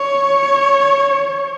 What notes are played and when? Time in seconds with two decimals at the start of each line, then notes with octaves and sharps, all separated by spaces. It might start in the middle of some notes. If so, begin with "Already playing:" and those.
Already playing: C#5